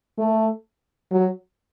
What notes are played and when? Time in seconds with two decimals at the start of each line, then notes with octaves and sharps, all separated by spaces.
0.18 A3
1.11 F#3